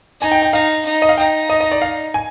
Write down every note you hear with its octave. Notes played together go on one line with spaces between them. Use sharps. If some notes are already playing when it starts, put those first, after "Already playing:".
D#4 G#5
G5
G5
D#4 F5
D#4
D#5
F5
D#4 G5
D#5
D#5
D5
F5
G#5